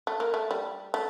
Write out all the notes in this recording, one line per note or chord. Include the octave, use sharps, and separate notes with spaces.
A3
A#3
A3
G3
A3